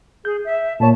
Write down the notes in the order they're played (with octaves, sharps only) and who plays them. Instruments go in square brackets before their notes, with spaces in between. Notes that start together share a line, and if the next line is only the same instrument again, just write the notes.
[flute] G#4 [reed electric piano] G6
[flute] E5
[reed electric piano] A#2 A#3 C#5 [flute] A5